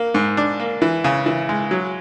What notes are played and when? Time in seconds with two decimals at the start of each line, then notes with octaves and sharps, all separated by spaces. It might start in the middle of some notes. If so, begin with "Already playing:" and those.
Already playing: A#3
0.14 G#2
0.37 D4
0.60 A#3
0.82 E3
1.04 C#3
1.26 E3
1.49 G#3
1.71 F#3